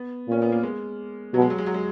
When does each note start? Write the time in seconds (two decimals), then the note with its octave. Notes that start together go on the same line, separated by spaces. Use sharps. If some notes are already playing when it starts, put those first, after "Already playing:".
Already playing: B3
0.28 A#2 C#4
0.42 B3
0.52 A#3
0.63 G#3
1.34 B2 F#3
1.42 G#3
1.50 F#3
1.58 G#3
1.66 F#3
1.74 G#3